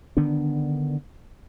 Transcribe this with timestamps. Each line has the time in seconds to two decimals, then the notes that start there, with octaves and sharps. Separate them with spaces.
0.17 D3 D#3 B3 D4